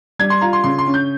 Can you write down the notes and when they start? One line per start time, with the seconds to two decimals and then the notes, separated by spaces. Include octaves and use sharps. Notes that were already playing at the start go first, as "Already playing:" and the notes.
0.19 G3 G#6
0.30 C6
0.41 F4 A#5
0.53 C6
0.64 C#3 C6
0.78 C6
0.87 C#4
0.94 G6